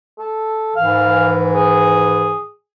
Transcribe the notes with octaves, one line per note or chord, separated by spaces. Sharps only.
A4
G#2 D#3 E3 F5
G#4